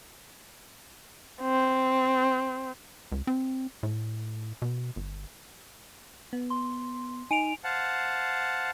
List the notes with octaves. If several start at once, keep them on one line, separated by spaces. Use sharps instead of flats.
C4
C#2
C4
A2
B2
G1
B3
C6
D#4 G#5 D7 F7
C5 F5 F#5 A5